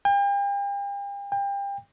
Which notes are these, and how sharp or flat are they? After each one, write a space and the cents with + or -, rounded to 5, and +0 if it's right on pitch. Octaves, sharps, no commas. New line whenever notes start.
G5 +40
G5 +30